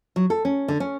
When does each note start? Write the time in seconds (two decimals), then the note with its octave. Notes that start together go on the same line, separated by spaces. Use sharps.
0.16 F#3
0.30 A4
0.45 C#4
0.68 D3
0.80 C#4